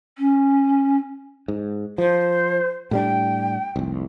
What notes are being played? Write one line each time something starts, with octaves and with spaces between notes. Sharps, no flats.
C#4
G#2
F3 C5
A2 G3 D4 G5
F1 C2